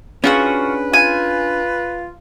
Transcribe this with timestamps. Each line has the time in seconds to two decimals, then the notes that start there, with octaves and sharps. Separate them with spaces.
0.24 C#4 D4 F4 F#4 G#4 B4 F#5
0.94 F4 G#5